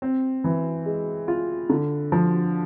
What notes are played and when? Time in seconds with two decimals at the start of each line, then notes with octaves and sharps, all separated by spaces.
0.02 C4
0.44 E3
0.86 G#3
1.28 F4
1.70 D3
2.12 F3